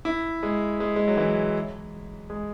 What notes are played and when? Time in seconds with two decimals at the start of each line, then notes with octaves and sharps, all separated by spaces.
0.05 E4
0.43 G#3
0.80 G#3
0.96 G#3
1.08 F#3
1.17 E3
2.30 G#3